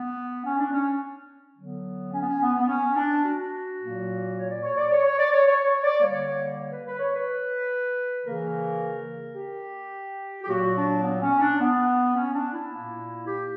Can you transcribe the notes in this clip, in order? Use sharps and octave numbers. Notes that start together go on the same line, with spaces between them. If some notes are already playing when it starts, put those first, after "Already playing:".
Already playing: B3
C#4
D4
C#4
D3 F#3 B3
C#4
B3
C#4
B3
B3
C#4
D4
F#4
A#2 F#3 A#3
C#5
D5
C#5
D5
C#5
C#5
D5
C#5
C#5
C#5
D5
D3 G3 A#3 C#5
C#5
B4
B4
C#5
B4
C#3 E3 A#3 A#4
G4
G4
A#2 F#3 A#3 F#4
D4
B3
C#4
D4
B3
C#4
D4
E4
A#2 A#3
G4